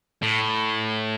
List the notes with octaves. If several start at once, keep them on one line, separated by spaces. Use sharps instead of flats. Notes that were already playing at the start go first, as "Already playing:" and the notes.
A2